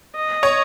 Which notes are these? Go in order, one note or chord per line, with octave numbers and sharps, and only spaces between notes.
D#5
C#5